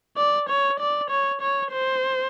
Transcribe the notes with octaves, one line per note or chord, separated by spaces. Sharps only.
D5
C#5
D5
C#5
C#5
C5